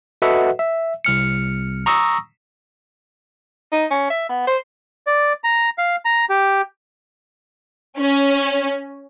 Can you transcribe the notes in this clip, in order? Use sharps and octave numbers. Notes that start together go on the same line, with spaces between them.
F#4 A4 B4 D#5 E5 F#5
E5
C2 F6 C#7
A#5 C#6 D#6 E6 A#6
D#4
C#4
E5
B3
C5
D5
A#5
F5
A#5
G4
C#4